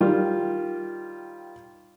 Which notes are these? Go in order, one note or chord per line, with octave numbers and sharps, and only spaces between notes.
D#3 G3 F4